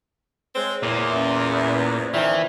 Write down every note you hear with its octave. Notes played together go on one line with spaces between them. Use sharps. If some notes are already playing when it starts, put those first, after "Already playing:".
G#3 C4 C#5
E2 A#2
C#4 E5
C5 D5
E2 A#2 D#3 E3 C5 D5 G5